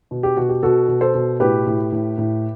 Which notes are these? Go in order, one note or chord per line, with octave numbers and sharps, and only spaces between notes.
B2
G4
B2 F#4
G4
B2 F#4 A4
B2
A4 C5
B2
A2 G4 B4
A2
A2
A2